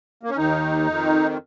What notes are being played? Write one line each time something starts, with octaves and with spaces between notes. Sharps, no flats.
A#3
C#4
D#2 D#3 D#4
F2 D#3